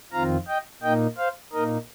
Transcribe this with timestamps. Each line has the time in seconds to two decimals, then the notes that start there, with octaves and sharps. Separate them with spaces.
0.12 F2 D#3 C4 F4 F5 A#5
0.47 D#5 G5
0.82 A#2 A#3 D#4 D#5 G5
1.18 C5 F5
1.53 A#2 A#3 D#4 A#4 D#5